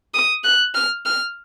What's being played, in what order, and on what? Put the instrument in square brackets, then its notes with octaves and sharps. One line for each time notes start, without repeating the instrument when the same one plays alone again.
[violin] D#6
F#6
F6
F6